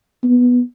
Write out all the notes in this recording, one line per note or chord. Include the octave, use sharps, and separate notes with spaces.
B3